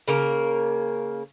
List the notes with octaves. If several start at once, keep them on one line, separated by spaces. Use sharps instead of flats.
C#3 A#3 A#4